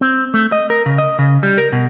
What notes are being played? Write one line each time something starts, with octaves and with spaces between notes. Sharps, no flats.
C4
A3
D#5
A#4
C#3
D#5
C#3
G3
A#4
B2